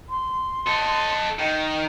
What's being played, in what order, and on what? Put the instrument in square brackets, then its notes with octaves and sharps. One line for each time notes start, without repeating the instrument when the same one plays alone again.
[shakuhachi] C6
[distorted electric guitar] A4 D#5
[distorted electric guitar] D#3 [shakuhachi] D#5